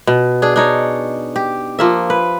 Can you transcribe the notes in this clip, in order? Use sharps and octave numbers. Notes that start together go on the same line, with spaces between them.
B2
D4 G#4
D4 D#4 C#5
G4
F3 A#3 E5
B4